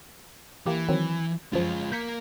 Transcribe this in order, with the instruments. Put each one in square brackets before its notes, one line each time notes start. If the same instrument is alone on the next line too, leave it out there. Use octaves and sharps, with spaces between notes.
[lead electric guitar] E3 [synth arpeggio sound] A#3 G4
[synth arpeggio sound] D#3 F#3 C4
[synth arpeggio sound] F#2 F3 [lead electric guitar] G#3 F4
[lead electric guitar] A#3 A#4 [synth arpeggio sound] G6 B6 C#7